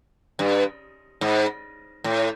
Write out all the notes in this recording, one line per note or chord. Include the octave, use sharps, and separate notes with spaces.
G2
G#2
A2